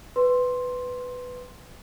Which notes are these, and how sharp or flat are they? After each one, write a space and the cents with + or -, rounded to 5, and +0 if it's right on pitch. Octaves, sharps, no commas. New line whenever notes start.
B4 +10 C6 +5